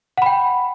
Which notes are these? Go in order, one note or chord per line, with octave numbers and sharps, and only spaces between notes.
F#5 G5 B5